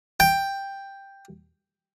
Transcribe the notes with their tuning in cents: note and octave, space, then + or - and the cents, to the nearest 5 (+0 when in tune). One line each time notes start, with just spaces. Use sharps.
G5 +5